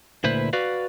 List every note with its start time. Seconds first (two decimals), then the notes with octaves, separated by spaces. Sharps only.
0.24 D2 A#2 E4 B4 C5
0.53 F#4 B4 D5 F5